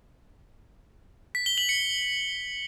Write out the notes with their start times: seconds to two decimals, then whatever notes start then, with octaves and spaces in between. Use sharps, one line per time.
1.35 B6
1.46 G7
1.58 F#7
1.69 C#7